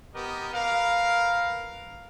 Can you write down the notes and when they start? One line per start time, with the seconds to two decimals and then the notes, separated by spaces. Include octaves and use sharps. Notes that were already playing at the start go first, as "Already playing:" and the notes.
0.15 B3 G4 A#4 D#5
0.53 A#4 B4 F5